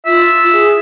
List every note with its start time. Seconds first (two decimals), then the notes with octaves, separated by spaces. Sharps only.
0.06 F4 E5
0.53 G#4